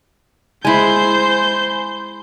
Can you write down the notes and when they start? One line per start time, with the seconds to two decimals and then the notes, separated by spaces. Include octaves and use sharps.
0.65 G#3 E4 C5 G#5 B5 G6